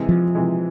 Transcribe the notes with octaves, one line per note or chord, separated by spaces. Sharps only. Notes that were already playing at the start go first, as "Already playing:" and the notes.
Already playing: C3 E3 G#3
F3
C3 E3 G#3